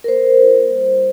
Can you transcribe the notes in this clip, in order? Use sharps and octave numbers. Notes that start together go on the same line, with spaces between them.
A#4
A#3 C5
F4
G3